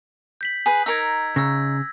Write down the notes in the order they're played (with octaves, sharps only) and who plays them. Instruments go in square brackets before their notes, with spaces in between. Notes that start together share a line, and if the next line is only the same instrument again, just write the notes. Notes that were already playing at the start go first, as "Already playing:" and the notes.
[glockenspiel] G6 B6 F#7
[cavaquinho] G#4 B4
[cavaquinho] D#4 A#4 [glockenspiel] E6 G#6
[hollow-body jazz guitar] C#3 [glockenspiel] E6 A#6